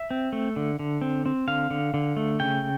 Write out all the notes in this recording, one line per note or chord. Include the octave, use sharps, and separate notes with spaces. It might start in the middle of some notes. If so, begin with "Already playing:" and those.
Already playing: E5
C4
A3
D3
D3
C4
C4
D3 F5
D3
D3
A3
C#3 G5